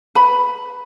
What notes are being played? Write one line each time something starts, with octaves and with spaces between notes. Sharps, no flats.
B4 B5